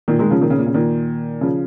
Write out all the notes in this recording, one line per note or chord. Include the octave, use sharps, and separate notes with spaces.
A#2 D#3
D#3 G#3
C#3 F3
A#2 D#3
C#3
A#2
C#3
A#2 D#3
C#3 F3